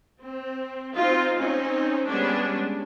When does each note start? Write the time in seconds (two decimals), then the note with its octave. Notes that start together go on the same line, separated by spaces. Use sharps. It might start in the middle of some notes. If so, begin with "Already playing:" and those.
0.19 C4
0.95 C4 D#4 F4
1.38 C4 C#4 D#4
2.07 G3 G#3 B3 C#4 D4